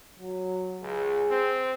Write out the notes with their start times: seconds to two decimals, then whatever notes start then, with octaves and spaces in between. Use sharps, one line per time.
0.19 F#3
0.83 C#2 G#4
1.31 C4